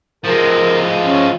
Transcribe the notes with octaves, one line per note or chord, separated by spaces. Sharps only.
F3 G#3 A#4
C#4